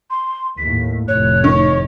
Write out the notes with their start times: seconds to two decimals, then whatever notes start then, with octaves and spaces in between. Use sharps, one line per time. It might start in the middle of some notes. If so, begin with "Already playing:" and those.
0.11 C6
0.58 D#2 A2 B6
1.08 F1 A2 C#5 F#6
1.44 D#3 C#6